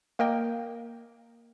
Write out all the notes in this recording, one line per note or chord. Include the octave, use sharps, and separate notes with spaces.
A#3 A#4 D#5 G5